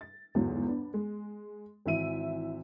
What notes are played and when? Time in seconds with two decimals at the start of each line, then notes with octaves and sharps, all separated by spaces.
0.01 A6
0.35 G1 E2 G#2 E3 F#3
0.67 B3 D4
0.94 G#3
1.86 G#1 E3 E5 D#7